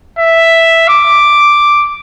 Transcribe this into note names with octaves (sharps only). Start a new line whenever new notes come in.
E5
D6